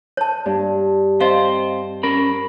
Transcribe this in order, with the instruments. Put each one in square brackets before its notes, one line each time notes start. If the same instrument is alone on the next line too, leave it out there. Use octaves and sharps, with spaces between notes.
[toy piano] C#5 A5
[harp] G2
[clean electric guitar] C4 C5 [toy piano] D#5 F5
[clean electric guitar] C#4 A#4 B5